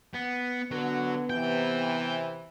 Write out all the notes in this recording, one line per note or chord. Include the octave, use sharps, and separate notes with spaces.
B3
D3 F#3 B3
C3 E3 G5